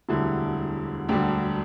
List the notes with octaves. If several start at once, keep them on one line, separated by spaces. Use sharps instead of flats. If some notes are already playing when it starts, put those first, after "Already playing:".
E1 D2 D3 G3 E4
E1 D2 D3 G3 G4